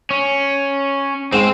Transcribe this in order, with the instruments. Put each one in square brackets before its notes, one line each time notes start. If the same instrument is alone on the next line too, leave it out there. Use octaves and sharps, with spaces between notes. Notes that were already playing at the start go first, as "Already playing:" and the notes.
[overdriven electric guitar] C#4
[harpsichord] G#2 [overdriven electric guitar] C4 C5